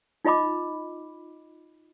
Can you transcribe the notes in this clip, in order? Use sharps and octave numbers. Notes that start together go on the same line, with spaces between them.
D#4 F4 D#5 B5 D6